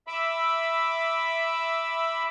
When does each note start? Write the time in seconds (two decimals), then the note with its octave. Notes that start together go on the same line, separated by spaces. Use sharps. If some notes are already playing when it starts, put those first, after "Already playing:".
0.07 E5 B5 D6 E6